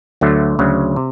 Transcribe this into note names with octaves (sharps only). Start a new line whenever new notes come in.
D2 D3 F#3 A3
D2 C#3 F#3
C3